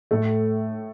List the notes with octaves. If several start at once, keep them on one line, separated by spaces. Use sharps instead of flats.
A2 A3